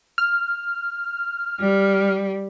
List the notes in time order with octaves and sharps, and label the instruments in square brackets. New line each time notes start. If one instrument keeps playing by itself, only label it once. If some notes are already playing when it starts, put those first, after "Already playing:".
[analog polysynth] F6
[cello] G3